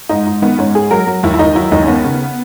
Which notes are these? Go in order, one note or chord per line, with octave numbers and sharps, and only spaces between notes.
G#2 D#4
G#2
D#3 B3
G#2 C#4
G#2 G#4
F#3 A#4
F#3
D#2 E4
E4
D#2 D#4
F#3 E4
D#2 D#4
C#4
D#3 B3
C#3